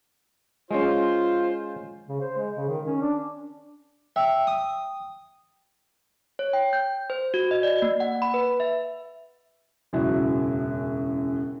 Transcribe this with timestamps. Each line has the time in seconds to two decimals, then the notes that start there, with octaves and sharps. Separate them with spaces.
0.71 G#3 C#4 F4 C5
2.08 C#3
2.21 C5
2.37 G#3
2.57 C#3
2.69 D#3
2.87 C#4
3.01 D4
4.16 E5 G5
4.47 D#6
6.39 C#5
6.53 G5
6.73 G6
7.10 C5
7.34 F#4
7.51 D#5
7.63 D5
7.82 A#3
8.00 F#5
8.22 B5
8.34 B4
8.60 E5
9.93 E1 F#2 C#3 E4 F#4